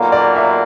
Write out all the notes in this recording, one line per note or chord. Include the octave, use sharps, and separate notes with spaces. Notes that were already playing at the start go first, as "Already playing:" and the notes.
Already playing: B1 A#2 F#3 A#3
D5
E5